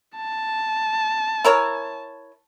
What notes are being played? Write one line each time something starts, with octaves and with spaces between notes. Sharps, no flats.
A5
E4 A#4 C#5